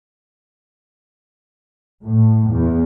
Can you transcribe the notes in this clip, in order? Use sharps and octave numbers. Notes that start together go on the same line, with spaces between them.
A2
E2